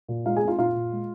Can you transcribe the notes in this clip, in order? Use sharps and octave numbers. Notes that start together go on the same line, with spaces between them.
A#2
G#3 F4 F5
G#4 G#5
C4
F4 F5
A#2 F4 F5
A#2
G#3